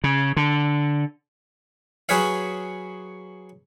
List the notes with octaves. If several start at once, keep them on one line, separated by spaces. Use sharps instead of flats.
C#3
D3
F#3 G#4 B4 C#5 F5